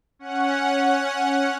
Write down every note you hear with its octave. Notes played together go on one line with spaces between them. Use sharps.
C#4 F#5